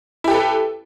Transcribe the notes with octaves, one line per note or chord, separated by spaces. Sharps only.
E4 G4 A4 B4